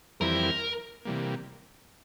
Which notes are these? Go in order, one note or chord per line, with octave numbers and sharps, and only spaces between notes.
F2 E3 G3 C4 E4 A#4
C3 E3 G3 A#3